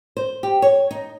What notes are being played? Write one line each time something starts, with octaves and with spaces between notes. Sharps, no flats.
C5
G4
C#5
D#4